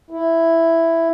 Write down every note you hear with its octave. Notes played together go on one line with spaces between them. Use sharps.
E4